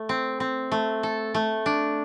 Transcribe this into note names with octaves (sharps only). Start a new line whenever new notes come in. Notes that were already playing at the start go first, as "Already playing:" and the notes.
Already playing: A3
C4
C4
A3
A4
A3
D4